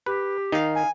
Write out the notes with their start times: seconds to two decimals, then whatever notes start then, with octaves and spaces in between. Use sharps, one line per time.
0.06 G4 B4
0.52 D#3 D#4 F5
0.75 G#5